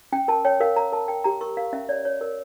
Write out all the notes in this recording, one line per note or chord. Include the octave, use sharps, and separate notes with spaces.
C#4 G5
A#4 A5
C#5 G5
A#4 F5
A#4 A#5
A#4 A5
A#4 G5
G4 A#5
A#4 C#6
A#4 F5
C#4 E5
C#5 D5
C#5
A#4